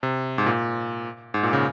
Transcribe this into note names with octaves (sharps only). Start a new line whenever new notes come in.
C3
G#2
A#2
G#2
A#2
C#3